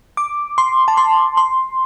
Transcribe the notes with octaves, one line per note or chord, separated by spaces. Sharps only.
D6
C6
A5
C6
C6